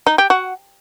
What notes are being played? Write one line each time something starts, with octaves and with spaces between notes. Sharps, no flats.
D#4
G4
F#4